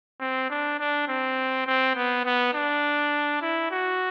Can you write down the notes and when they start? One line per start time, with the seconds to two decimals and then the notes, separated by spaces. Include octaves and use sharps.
0.20 C4
0.49 D4
0.79 D4
1.08 C4
1.67 C4
1.96 B3
2.25 B3
2.54 D4
3.42 E4
3.71 F#4